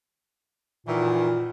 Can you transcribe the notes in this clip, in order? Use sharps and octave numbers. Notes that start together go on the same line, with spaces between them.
F#2 A#2 D#3 E3